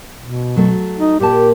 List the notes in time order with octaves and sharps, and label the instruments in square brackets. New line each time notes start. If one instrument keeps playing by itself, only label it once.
[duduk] B2
[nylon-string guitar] F#3 A3
[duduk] D#4
[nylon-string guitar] A#2 A#3 A5 [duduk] G4